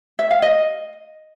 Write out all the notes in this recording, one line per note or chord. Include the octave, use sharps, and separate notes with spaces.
E5
F5
D#5